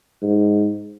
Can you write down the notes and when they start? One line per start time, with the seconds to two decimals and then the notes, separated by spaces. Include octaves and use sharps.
0.22 G#2